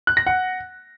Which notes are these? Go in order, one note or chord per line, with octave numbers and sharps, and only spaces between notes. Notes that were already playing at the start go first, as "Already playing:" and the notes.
F#6
A#6
F#5